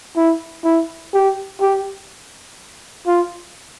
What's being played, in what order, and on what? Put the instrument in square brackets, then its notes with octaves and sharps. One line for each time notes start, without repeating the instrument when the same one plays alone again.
[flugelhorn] E4
E4
G4
G4
F4